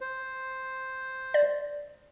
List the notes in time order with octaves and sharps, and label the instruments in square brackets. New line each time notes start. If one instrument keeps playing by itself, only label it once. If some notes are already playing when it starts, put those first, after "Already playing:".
[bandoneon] C5
[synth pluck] D5